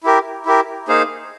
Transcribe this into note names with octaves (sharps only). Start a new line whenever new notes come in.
E4 G4 A#4
E4 G4 A#4
A#3 D#4 G#4 C5 F5